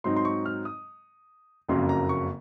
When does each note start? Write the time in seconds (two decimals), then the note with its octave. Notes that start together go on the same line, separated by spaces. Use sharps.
0.04 G#2 F#3 C4 D#4 C6
0.16 C6
0.25 C#6
0.46 F6
0.65 D#6
1.69 F#1 F2 C#3 F#3 A#3 C6
1.89 A#5
2.09 C#6